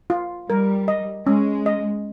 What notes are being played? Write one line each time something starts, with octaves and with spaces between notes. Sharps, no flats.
F4
G3 A#4
D#5
G#3 C#4
D#5